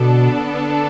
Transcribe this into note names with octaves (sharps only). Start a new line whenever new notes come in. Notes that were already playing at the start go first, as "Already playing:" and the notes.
Already playing: B2 D3 B3 D4 A4